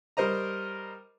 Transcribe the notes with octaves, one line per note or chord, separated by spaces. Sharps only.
G3 A#4 C5 D#5 A#5